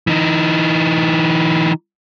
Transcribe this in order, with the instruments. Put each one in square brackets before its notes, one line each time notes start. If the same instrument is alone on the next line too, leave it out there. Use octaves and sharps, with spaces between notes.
[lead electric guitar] E3 D#4